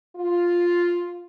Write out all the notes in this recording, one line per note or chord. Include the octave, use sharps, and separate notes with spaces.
F4